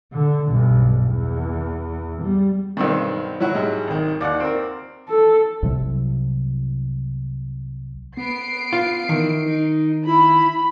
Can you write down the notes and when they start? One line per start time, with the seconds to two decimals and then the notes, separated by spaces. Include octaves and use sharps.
0.12 D3
0.50 B1 G2
1.04 E2
2.22 G3
2.77 B1 G2 D#3 B3 C4
3.40 F#3 E4 F#4
3.54 G#2 G3 G#3
3.87 G#1 D#3
4.21 D#2 D5 F#5
4.40 C4 A#4
5.09 A4
5.62 C2 C3 F#3
8.17 B3 C7 D7
8.73 F4
9.09 D#3 E3
9.46 D#4
10.07 E4 B5